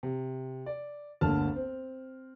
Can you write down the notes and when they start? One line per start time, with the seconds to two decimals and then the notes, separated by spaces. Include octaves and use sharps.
0.03 C3
0.66 D5
1.21 G1 D2 D3 A#3 A5 F6
1.56 C4